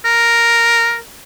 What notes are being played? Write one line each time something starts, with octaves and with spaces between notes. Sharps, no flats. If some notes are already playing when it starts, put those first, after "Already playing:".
A#4